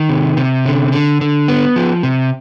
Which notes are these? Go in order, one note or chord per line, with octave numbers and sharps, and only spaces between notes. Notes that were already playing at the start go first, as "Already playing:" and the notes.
Already playing: D#3
C3
C3
D3
D3
D3
B3
F3
C3